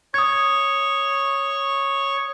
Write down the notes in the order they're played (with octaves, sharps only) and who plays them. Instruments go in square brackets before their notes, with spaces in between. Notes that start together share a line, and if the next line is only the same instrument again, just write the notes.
[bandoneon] C#5 C#6 [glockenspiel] D#6 G#6